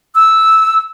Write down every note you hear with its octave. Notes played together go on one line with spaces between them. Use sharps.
E6